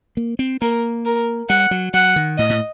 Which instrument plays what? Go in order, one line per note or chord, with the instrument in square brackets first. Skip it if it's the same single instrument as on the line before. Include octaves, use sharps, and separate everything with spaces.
[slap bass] A#3
C4
[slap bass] A#3 [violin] A#4
[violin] A#4
[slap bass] G3 [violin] F#5
[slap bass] F#3
[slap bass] F#3 [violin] F#5
[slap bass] D#3
[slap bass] A2 [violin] D#5
[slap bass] A2